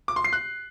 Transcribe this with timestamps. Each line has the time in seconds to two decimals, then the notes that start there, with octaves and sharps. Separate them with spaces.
0.08 D6
0.16 C6
0.24 C7
0.33 F#6